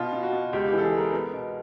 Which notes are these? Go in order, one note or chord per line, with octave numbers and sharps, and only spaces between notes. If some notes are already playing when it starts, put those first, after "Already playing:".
Already playing: B2 F4
B2
F#4
B2
C#2 G4
E3 G4
A4
G#4
G#3
A#4
B3
B2